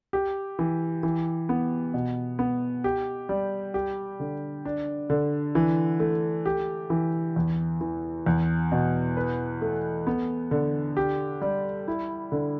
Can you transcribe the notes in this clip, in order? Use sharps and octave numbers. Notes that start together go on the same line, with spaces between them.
G4
E3
E3
B3
B2
B3
G4
G3
G4
D3
D4
D3
E3
A3
G4
E3
E2
E3
E2
B2
B4
A3
B3
D3
G4
G3
E4
D3